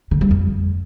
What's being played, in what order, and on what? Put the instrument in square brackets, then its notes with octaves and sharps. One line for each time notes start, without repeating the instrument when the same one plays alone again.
[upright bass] D3
G3
F2